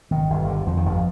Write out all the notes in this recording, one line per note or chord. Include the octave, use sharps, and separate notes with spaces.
G1 D#3
G1
D3
F2 F3
D#3
G1 F3